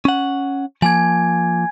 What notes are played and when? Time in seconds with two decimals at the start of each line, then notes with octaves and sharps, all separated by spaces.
0.05 C#4 F#5
0.82 F3 A#3 G#5 G#6